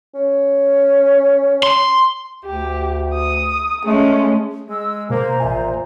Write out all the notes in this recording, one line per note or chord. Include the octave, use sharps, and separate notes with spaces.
C#4
C6
D2 G4
D#6
G#3 A3 C#4
G#3 E6
B2 A#3 C5 A#5
A1 A#2 E5 G#5